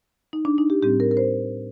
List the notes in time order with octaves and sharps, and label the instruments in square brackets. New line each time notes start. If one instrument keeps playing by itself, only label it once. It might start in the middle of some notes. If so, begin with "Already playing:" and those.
[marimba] D#4
D4
D#4
G4
A2 G3 C4 G4
A#4
A#4
C5